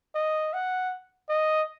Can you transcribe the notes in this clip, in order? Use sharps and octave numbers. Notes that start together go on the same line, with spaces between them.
D#5
F#5
D#5